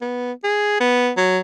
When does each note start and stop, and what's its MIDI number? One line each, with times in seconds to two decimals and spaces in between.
0.01 0.32 59
0.44 0.77 68
0.80 1.10 59
1.17 1.40 54